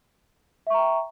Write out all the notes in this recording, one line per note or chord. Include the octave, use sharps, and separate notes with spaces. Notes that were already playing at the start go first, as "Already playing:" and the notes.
E5 G5 A#5 C#6